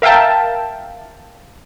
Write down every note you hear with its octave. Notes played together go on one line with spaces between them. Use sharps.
A#4 E5 F5 G5 A5